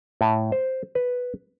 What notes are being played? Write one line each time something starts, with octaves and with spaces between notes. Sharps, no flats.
A2
C5
B4